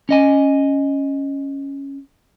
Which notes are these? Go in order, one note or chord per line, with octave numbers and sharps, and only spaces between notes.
C#4 D#5 G#5